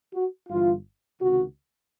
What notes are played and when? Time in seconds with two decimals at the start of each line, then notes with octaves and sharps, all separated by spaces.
0.14 F#4
0.49 G1 G2 E3 F4
1.19 C#2 C3 D#3 F#4